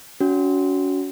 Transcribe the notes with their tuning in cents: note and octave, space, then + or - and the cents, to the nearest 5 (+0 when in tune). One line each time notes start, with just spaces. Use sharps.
C#4 +35 F#4 +0